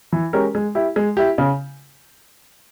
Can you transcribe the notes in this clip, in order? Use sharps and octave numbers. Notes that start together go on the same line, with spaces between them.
E3
G#3 C#4 G4 A#4
G#3
E4 G4
G#3
E4 G4
C#3